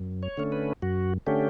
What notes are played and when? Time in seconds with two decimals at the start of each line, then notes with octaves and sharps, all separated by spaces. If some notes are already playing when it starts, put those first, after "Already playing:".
Already playing: F#2
0.23 C#5
0.37 D3 A3 C#4
0.52 B4
0.82 F#2 F#4
1.26 D3 A3 C#4 G4